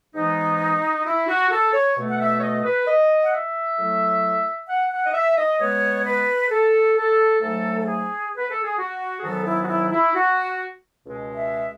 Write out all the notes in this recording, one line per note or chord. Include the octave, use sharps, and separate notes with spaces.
G#2 E3 G#3 B3 D#4
E4
F#4
A4
C#5
B2 A3
F#5
E5
C#5
D#5
B4
D#5
F#5
E5
A2 F#3 A3
F#5
F#5
D#5
E5
D#5
B2 G#3 B3 C#5
B4
A4
A4
G#2 F#3 A3 A4
A4
G#4
B4
A4
G#4
F#4
G#4
G#2 D#3 F#3 B3 A4
E4
F#4
E4
E4
F#4
C#2 B2 G#3
E5